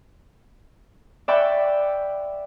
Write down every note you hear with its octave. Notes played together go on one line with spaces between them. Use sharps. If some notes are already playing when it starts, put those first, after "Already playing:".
D5 E5 F#5 G5 B5 C#6